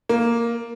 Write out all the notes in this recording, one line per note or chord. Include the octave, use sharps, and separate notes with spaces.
A#3